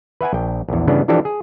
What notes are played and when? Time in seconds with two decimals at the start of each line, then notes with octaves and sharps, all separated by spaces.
0.21 B4 E5 F#5 G#5
0.33 A#1 G5
0.68 A#1 E2
0.87 G2 C#3 E3 B3 C#4 D4
1.08 E3 F3 D4 G4 A4
1.25 G#4